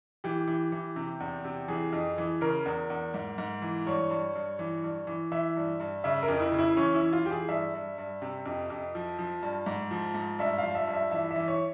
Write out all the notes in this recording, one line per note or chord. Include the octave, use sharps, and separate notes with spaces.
E3 G4
E3
E3
C3
E2
C3
E3 G#4
F2
E3
C#3 A#4
E2
E2
G#2
G#2
E3
G2 C#5
G2
G2
E3
G2
E3
E3 E5
G2
G2
C#3 E5
A#4
F2
E4
C#3
E4
E3 C#4
E4
E3
F4
E3 G4
G#4
G2 E5
G2
G2
C3
F2
F2
F3
F3
G2
G#2
F3
G#2
G2 E5
F3 F5
E5
G2
E5
E3 E5
E5
E3
C#5